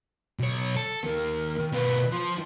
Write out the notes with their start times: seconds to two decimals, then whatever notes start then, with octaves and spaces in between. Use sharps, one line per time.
0.39 B1 C#5
0.76 A4
1.03 D#2 D#3 A#4
1.73 B2 F4 B4
2.11 F3 C6